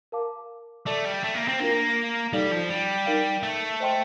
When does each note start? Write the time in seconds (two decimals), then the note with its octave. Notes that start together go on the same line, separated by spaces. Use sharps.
0.12 A#4 F5 A5 D6
0.86 A3 A4 D5 A5 D6
1.05 G3
1.23 A3
1.34 A#3
1.48 C4
1.60 A#3 D4 F4 A#4
2.33 G3 D#4 A4 D5 F5
2.52 F3
2.69 G3
3.06 D#4 A#4 F5
3.43 A3
3.80 C5 D#5 G5 C6